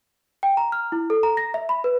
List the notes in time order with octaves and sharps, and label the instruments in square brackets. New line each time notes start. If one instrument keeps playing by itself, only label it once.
[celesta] G5
A#5
F6
E4
A4
A#5
A#6
E5
B5
B4